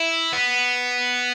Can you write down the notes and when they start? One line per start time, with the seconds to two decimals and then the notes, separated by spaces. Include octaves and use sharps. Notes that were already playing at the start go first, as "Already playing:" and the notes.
Already playing: E4
0.33 B3